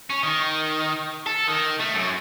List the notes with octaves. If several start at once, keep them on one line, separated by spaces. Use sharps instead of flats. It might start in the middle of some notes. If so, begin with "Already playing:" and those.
C#4
D#3
A4
D#3
A3
F#2